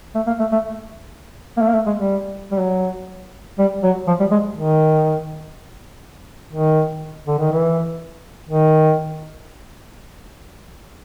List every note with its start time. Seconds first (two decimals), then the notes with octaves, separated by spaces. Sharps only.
0.15 A3
0.27 A#3
0.39 A3
0.52 A3
1.57 A#3
1.61 A3
1.68 A#3
1.74 A3
1.86 G#3
1.98 G3
2.51 G3
2.60 F#3
3.59 G3
3.83 F#3
4.07 F3
4.20 G3
4.31 G#3
4.56 D#3
6.53 D#3
7.27 D3
7.39 D#3
7.52 E3
8.49 D#3